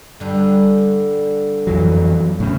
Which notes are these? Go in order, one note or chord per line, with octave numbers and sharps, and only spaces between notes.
G2 D3
F2 E3 F#3
A2 C#3